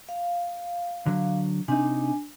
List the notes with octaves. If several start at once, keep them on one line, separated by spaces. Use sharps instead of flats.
F5
D3 F#3
C3 D4 D#4 G#5